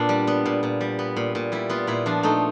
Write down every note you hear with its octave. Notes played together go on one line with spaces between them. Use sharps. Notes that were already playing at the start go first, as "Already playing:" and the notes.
Already playing: A#2 B3 D4
G3
B3
A#2
A#2
G3
B3
A#2
A#2
G3 E4
B3 F4
A#2 E4
F3 D4
A3 D#4